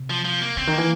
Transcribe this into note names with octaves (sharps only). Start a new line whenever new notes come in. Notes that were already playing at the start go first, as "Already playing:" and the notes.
Already playing: C3
F3
F3
A#3
C#3 C4
D#3
A#3
E3